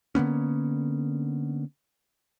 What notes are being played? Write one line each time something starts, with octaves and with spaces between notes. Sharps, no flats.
D3 A#3 B3 C#4